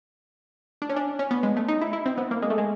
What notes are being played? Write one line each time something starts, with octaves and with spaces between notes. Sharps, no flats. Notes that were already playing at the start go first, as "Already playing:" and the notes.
D4
C#4
D4
C#4
B3
G#3
A3
D#4
E4
E4
C4
B3
A#3
G#3
A3
G#3